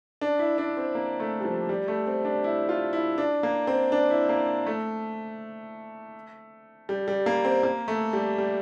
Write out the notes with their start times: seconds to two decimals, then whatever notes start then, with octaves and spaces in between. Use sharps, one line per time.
0.21 D4
0.39 E4
0.58 D4
0.77 C4
0.95 A#3
1.20 A3
1.41 G3
1.45 F3
1.69 G3
1.88 A3
2.07 C4
2.25 D4
2.44 E4
2.69 F4
2.93 E4
3.18 D4
3.43 A#3
3.67 C4
3.92 D4
4.10 E4
4.29 A#3
4.67 A3
6.89 G3
7.08 G3
7.26 A#3
7.45 C4
7.63 A#3
7.88 A3
8.13 G3
8.38 G3